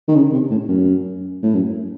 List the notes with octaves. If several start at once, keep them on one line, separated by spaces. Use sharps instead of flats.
D#3
C#3
C3
A2
F#2
A2
F#2